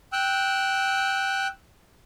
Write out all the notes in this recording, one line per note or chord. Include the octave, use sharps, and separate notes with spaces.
G5 E6 F#6